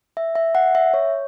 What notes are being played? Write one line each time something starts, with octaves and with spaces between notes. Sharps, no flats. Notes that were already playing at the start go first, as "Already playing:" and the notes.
E5
E5
F#5
E5
C#5